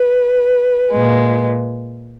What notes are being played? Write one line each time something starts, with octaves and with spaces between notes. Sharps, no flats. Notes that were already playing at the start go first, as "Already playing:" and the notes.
Already playing: B4
A#2 G#3